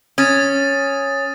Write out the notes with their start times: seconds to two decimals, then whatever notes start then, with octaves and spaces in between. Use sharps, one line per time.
0.18 C#4 D#6 A6 D#7